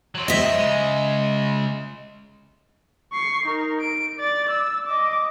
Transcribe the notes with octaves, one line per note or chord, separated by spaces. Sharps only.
F#3 C4
D#5 E5
C#3 G#3
C#6 C7
D#4 A#4
D7
D5 A6
E6
D#5 D6